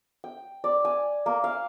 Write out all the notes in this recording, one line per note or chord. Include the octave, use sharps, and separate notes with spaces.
G5
D5
G#5
A#3
F5